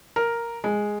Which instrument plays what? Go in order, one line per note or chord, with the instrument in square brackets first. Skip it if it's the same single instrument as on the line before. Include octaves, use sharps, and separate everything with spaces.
[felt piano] A#4
G#3